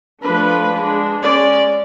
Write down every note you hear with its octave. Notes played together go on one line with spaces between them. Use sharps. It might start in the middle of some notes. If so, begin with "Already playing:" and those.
F3 A3 D4 B4
G#3 D4
G#3 C#4 D5